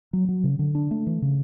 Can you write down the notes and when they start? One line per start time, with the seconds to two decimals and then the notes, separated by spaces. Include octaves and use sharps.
0.13 F#3
0.29 F#3
0.44 C#3
0.59 D3
0.75 D4
0.91 A3
1.07 E3
1.22 C#3